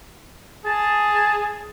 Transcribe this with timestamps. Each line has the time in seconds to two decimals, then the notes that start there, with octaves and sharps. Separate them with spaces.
0.66 G#4 A5